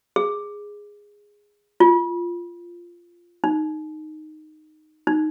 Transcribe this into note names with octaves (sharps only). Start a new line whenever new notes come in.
G#4
F4
D#4
D#4